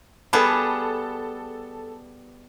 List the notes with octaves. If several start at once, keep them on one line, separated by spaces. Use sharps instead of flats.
G3 B3 G#4 A4 A5